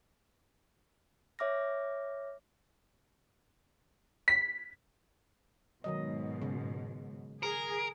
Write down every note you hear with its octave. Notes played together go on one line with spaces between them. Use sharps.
C#5 E5 D6 F6 A#6
B6
G#2 B2 D#3 F#3 D#5
C#3
G#4 A#4